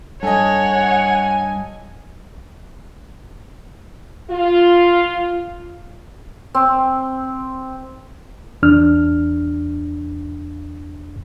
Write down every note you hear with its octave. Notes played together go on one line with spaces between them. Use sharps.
G2 A4 C#5 D#5 F#5 G#5
F4
C4
E2 D4 F6